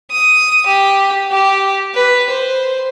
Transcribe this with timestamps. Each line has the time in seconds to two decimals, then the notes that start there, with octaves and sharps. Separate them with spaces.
0.11 D#6
0.66 G4
1.31 G4
1.94 B4
2.30 C5